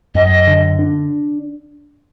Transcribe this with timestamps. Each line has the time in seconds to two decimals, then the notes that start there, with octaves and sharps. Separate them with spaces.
0.15 F#2 D#5
0.47 D3
0.79 D4